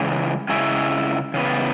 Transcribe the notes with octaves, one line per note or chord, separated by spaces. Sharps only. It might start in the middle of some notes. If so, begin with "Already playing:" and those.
Already playing: C#3 E3 G#3
C#3 G#3 C#4 E4
C#3 E3 B3